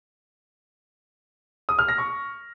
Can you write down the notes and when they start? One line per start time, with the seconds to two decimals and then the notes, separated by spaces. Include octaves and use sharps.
1.69 D#6
1.79 F6
1.88 A#6
1.98 C#6